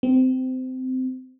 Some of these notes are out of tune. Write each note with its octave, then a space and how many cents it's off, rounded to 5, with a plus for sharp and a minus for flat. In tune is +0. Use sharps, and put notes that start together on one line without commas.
C4 -20